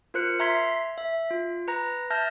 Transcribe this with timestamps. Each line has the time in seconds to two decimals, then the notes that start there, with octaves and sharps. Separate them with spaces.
0.14 F4 A#4 C5 F#6 C#7
0.40 E5 A#5 C6 G#6 B6 C7
0.98 E5
1.31 F4
1.68 B4 A#5 A#6
2.10 E5 A5 F6 G6 A6 A#6